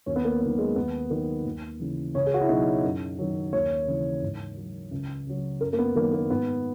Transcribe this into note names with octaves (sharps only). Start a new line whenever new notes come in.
D#2 C#4
B3
A#3
D#3 F#3 B3
G#3
D#2 B3
D#3 F#3 A#3
D#2
C#3 E3
C#2 C#4
G#4
F#4
E4
B2 F#3 D#4
F#2
D#3 F#3
D#2 C#5
C#3 E3
G#2
F#3
C#2
C#3 F#3
F#2 A#4
A#3
B3
D#3 F#3 A#3
A#3
G#2 B3